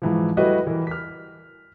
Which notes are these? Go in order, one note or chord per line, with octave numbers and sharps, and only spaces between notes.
G#2 E3 F3
G3 A3 E4 F#4 B4 D#5
E3 A#4
F6 B6